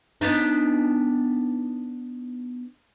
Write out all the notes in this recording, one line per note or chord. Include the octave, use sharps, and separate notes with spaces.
B3 D4 D#4